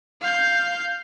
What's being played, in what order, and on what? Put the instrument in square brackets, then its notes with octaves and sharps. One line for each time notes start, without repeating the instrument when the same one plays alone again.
[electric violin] F5 G6